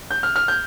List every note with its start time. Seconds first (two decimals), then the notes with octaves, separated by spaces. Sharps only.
0.11 G6
0.23 F6
0.36 F6
0.48 G6